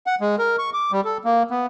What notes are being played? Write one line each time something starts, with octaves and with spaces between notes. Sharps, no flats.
F#5
G#3
A#4
C#6
D6
G3
A4
A#3
B3